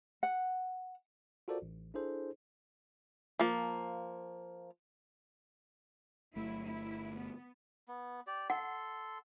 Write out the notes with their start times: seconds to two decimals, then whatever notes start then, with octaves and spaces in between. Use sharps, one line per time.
0.23 F#5
1.48 F4 F#4 A4 A#4 C5 D5
1.62 A1
1.94 D4 E4 G#4 A4 C5
3.39 F3 A#3
6.36 G1 F#3 A3 E4
6.67 E4
7.15 B3
7.88 B3
8.27 G4 D5
8.50 A4 F#5 C6